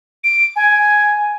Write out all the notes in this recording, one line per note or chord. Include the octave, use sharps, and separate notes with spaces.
D7
G#5